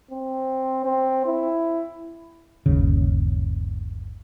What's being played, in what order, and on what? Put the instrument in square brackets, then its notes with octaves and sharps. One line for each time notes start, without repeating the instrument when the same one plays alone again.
[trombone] C4
C4
E4
[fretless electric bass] G1 D#2 C#3